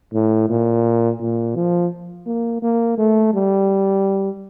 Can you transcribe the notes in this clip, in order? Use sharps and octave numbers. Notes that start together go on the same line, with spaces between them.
A2
A#2
A#2
F3
A#3
A#3
A3
G3